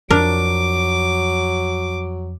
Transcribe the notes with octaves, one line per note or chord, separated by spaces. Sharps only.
F2 F#3 D4 A#4 D6